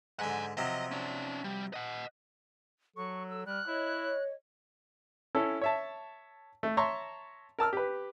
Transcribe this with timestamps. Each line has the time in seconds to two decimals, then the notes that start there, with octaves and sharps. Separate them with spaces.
0.19 G#2 D3 F#5 G#5
0.57 C3 F3 F#3 D#5
0.92 C#4 D5
1.44 G3
1.74 D#5 F#5
2.96 F#3 A4 C#6
3.29 E6
3.46 G3 F6 F#6
3.67 E4 C#5 D#5
5.35 C#4 E4 A4
5.61 C#5 E5 A5
6.63 A3
6.77 C#5 E5 A5 A#5 C6 C#6
7.59 A#4 A5 E6 F6
7.73 G4 B4